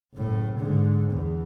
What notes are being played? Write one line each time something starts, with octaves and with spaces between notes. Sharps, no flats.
F#1 A2
G#2 D3
E2